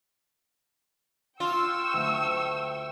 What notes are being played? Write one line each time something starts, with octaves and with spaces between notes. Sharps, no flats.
F4 G5 C#6 E6
D2 A3